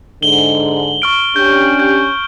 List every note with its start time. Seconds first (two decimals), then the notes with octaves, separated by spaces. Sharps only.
0.22 G#2 D3 F#7 G7
1.02 C#6 F6 D7
1.36 C#4 D4 G4 G6
1.79 G6